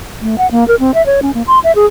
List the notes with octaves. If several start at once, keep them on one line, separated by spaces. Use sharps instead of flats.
A3
F#5
A#3
A#4
C4
E5
C#5
C#4
A#3
C6
E5
G#4